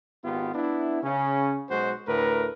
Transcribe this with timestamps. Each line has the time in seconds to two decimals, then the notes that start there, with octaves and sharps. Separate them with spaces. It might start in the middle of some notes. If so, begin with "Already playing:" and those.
0.25 G#1 B3 F4 G4
0.54 B3 D4 E4
1.03 C#3 C#4
1.70 B1 G#3 F#4 C5
2.08 D2 A2 A#4 B4